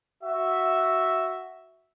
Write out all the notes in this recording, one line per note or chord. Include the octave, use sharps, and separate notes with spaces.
F#4 E5